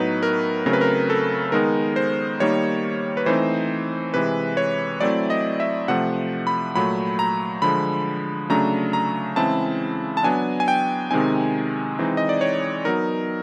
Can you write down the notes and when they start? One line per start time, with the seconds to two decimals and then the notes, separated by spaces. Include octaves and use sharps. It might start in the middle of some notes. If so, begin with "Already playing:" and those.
Already playing: A2 F#3 B3 D#4 B4
0.23 A#4
0.66 C#3 F#3 A3 C4 A#4
0.73 B4
0.81 A#4
1.10 A4
1.52 D#3 G#3 B3 D#4 A#4
1.96 C5
2.40 D#3 G3 A#3 D#4 C#5
3.17 B4
3.26 E3 A3 C4 D#4 C5
4.14 C3 E3 G#3 B4
4.57 C#5
5.01 F#3 A3 C4 E4 D5
5.30 D#5
5.60 E5
5.88 C3 F3 A3 F#5
6.47 B5
6.75 A#2 F#3 A3 B5
7.19 A#5
7.62 D3 F3 G#3 B5
8.50 C#3 F#3 A3 D4 A#5
8.93 A#5
9.36 C#3 E3 G#3 C4 E4 A5
10.17 A5
10.23 F#3 B3 D4 G#5
10.60 G#5
10.68 G5
11.11 C3 D#3 G#3 C4 D#4 G#5
11.99 E3 G#3 C4 D#4
12.17 D#5
12.29 D5
12.41 C#5
12.85 F#3 B3 D#4 A#4